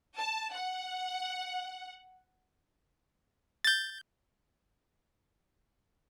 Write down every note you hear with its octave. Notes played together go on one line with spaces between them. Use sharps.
A5
F#5
G6 A6